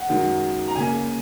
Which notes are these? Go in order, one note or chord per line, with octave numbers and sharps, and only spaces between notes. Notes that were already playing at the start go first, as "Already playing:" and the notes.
Already playing: F#5
F#2 D#3 G#3
A#5
C#3 A#3 G#5